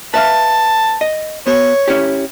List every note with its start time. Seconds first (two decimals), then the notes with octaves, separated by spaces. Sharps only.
0.14 B4 E5 F5 A5
1.01 D#5
1.47 B3 F#4 C#5
1.88 C#4 E4 G4